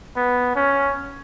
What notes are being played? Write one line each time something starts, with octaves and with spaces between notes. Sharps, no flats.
B3
C#4